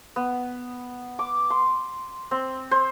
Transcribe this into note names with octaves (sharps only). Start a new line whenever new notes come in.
B3
D6
C6
C4
C5